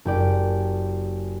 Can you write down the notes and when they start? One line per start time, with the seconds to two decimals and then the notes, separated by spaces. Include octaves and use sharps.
0.05 F#1 G4 D5